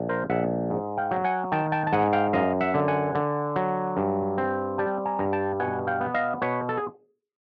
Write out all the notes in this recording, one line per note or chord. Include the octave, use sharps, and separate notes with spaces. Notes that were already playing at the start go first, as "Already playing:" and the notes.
Already playing: A#1
A#4 C5
A#1 E5 F#5
G#2
F5 G5
F#3
F#5 G#5
D#3 G5 A5
G5 A5
A5
G#2 F#5 G#5
F5 G5
F#2 D#5 F5
E5 F#5
D3
F#5 G#5
D3
F#3
G2
C4
G3 G5 A5
G#5 A#5
G2
G5 A5
B2 F#5 G#5
F5 G5
B3
D#5 F5
B2 B4 C#5
A4
G#4